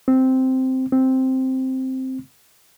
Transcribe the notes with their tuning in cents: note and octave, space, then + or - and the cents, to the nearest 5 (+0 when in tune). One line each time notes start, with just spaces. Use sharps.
C4 -5
C4 +0